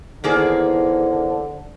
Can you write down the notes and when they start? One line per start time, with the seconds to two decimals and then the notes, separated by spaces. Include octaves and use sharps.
0.24 E2 D3 D#3 A#3 G#4 C5